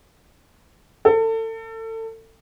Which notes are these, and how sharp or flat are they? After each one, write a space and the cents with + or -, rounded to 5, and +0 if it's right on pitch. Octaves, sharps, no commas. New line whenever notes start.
A4 +30